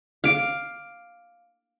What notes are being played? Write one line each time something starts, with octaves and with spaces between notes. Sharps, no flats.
F5 D6